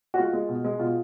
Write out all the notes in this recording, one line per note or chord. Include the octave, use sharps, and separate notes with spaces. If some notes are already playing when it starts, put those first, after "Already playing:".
F#4
G#3 F4
G#3
B2
G#3
B2 F4